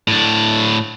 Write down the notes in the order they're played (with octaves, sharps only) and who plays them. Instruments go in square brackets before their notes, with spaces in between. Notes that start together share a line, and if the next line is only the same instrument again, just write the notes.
[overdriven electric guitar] A2 D4